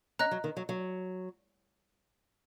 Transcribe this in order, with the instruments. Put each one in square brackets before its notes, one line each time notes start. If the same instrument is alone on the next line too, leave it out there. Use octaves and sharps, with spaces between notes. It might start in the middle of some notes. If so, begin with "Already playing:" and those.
[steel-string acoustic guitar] C#4 [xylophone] D#5 A#5 F#6
[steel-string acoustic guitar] F#3
D#3
F#3
F#3